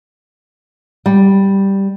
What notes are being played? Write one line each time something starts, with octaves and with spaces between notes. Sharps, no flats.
G3